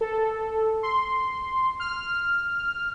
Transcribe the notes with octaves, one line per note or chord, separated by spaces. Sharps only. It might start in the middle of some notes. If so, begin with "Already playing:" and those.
A4
C6
F6